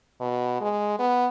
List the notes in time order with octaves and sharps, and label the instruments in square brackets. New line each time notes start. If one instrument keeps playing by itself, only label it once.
[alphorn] B2
G#3
B3